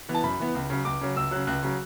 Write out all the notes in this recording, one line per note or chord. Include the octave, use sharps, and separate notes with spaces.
E3 B3
A5
F#2 B5
E3 B3
C#2
C#3 F#3
C#2 D6
C#3 F#3
C#2 E6
C#3 F#3 F#6
C#2 F#6
C#3 F#3